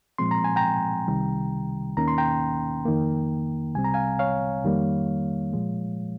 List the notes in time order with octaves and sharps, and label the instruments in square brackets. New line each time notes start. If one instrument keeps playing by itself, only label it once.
[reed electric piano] A#2 F3 G#3 C4 C6
A#5
G#5
G5 A#5
C2 C3 D#3 G3
D#2 D#3 A#3 C#4 A#5
C6
G5 A#5
F2 D#3 A#3
C2 C3 G3 C4 G#5
A#5
F5 G#5
C#5 F5
F2 D#3 G3 A#3
A#2 F3 G#3